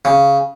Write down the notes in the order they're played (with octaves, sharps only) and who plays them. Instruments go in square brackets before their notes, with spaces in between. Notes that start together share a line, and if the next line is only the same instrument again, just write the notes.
[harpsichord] C#3